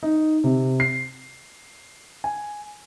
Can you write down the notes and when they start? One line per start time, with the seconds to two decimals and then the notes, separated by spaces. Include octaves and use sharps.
0.03 D#4
0.44 C3
0.80 C7
2.24 G#5